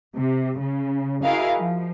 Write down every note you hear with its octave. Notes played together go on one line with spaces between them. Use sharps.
C3
C#3
E4 F#4 G#4 A#4 D#5 F5
F3